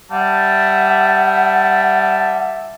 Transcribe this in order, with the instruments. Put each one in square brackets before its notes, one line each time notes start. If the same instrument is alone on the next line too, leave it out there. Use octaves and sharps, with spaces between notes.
[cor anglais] G3 [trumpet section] E5 A5 [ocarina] F#5